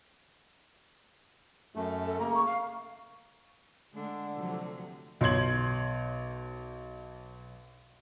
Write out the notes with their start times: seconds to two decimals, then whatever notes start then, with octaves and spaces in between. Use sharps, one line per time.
1.76 F#2 A3
2.05 A4
2.19 C#3 A#3 A#5
2.35 C#6
2.46 F5
3.93 D3 G#3 A3 D4
4.36 C3 F3 F#3
5.21 B1 C#5 C6 G#6 F#7